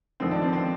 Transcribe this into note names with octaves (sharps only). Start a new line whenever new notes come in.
D#2 D3 F3 C4
D4
C4
C4